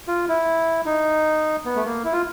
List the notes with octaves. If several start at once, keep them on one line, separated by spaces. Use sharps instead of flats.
F4
E4
D#4
B3
A3
A#3
E4
F4